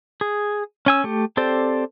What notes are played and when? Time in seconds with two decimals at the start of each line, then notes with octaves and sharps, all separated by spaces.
0.21 G#4
0.86 C#4 G#5 E6
1.04 A3 G4
1.37 C4 G4 A4 C5 D5